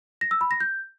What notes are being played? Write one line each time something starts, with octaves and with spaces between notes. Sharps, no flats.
A#6
E6
B5
A#6
G6